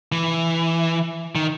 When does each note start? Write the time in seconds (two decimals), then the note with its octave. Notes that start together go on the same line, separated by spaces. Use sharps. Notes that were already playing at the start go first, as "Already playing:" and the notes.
0.12 E3
1.35 D#3